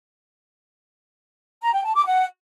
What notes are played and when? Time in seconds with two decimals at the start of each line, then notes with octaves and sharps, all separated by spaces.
1.62 A#5
1.73 G5
1.84 A5
1.95 D6
2.06 F#5